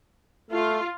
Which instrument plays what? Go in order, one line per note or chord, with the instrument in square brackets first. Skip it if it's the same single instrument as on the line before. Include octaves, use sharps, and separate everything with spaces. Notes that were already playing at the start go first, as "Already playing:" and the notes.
[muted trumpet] A3 [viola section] F4